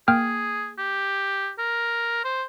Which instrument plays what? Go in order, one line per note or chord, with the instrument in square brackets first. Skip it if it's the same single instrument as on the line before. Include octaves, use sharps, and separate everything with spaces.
[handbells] A#3 G5 F6 [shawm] G#4
[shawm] G4
A#4
C5